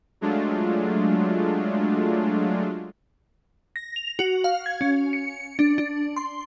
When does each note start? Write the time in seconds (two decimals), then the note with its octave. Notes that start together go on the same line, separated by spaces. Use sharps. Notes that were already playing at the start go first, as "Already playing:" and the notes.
0.21 F#3 G#3 A3 D4 F4
3.76 A#6
3.96 F7
4.19 F#4
4.44 F5
4.66 G#6
4.81 C#4
5.13 C#7
5.59 D4
5.78 D4
6.16 C6